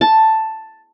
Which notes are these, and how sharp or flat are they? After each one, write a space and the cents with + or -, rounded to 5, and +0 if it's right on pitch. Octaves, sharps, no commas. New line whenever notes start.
A5 +5